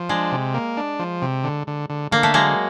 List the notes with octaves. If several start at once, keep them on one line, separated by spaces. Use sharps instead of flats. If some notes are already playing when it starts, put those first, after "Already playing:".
Already playing: F3
G#3 D4
C3
A#3
D4
F3
C3
D3
D3
D3
D3 A#3
A3
F#3 G#3 A#3